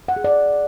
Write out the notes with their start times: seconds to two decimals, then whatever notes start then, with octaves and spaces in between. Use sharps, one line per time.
0.08 F#5
0.16 G#4
0.24 D5